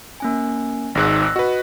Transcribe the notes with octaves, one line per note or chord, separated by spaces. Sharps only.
A#3 C#4 G#5
G#1 G#2 E6 F#6 A#6
F#4 B4 D#5